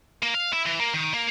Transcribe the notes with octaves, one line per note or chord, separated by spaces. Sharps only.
A#3
F5
E4
E3
A#3
D#3
A#3